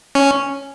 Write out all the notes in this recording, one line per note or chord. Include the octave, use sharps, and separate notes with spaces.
C#4